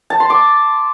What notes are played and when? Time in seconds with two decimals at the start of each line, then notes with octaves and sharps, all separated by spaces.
0.10 A5
0.20 C6
0.30 D6